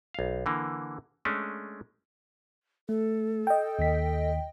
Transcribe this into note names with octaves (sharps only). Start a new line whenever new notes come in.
B1 F5
D3 E3 A#3
G#3 A3 C#4 D4
A3 A4
D#5 G5
D#2 D#3 B6